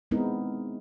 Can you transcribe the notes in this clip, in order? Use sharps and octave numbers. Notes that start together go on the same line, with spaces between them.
G#3 B3 C4 D#4 E4 A#4